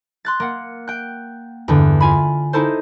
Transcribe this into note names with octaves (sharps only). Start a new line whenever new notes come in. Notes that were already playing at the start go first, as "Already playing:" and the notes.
C6 F#6 A6
A#3 F#5
G5 F#6
E2 G2 D3
F4 G#5 B5
D#4 E4 A4 C5